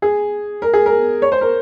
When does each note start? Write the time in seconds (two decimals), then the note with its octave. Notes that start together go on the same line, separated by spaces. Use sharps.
0.02 G#4
0.62 A#4
0.73 G#4
0.86 A#4
1.22 C#5
1.32 C5
1.41 A#4